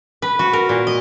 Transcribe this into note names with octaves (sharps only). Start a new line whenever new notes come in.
B4
F#4
A#4
A#2
D#5